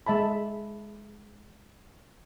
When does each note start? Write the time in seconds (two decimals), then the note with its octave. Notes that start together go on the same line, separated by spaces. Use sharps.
0.06 G#3 E5 A5 B5